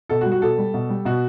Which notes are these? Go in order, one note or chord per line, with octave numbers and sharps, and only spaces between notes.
B2 A4
F#4
G3
F#4
B2 A4
G3
B2
G3
B2 F#4